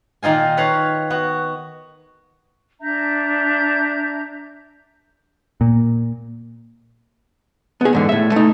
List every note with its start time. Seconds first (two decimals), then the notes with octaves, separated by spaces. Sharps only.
0.23 A#2 D#3 D#4 F4 G#5
0.57 B4 C#5 F5 A#5
1.10 B3 F#4
2.81 D4 E5 A#5 G6
5.61 A#2
7.81 B3 G#4
7.93 E2 G#2 D3
8.09 A2 E5
8.32 A3 D#4